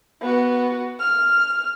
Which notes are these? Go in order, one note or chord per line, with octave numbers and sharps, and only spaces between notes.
B3 F#4
F6